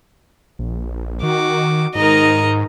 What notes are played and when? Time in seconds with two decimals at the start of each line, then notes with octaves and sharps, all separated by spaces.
0.59 A#1
1.23 D#3 F#4 D6
1.95 G#2 D#3 D#4 A#4 D#5 A#5